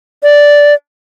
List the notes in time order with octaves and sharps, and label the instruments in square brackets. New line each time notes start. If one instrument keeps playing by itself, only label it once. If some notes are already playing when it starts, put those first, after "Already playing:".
[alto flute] D5